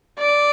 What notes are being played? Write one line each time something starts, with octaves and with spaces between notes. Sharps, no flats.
D5